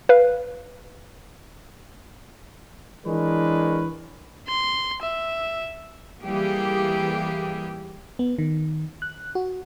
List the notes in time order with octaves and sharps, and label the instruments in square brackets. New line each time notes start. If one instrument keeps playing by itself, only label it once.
[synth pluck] B4 F5
[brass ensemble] E3 G#3 D4 A#4 B4 C#5
[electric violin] C6
E5
[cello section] E3 G3 A#3 G4 G#4
[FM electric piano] B3
D#3
F#6
F#4